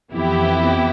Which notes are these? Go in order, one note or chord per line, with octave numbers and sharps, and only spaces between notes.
F2 E3 B3 E4 G4